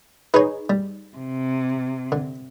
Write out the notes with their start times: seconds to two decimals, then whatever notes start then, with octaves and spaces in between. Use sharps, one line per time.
0.34 D#4 G#4 B4 C#5
0.70 G3
1.17 C3
2.12 D3